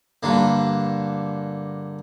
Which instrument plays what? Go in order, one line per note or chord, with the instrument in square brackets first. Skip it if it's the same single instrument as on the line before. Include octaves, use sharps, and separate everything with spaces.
[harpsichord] G2 D3 A#3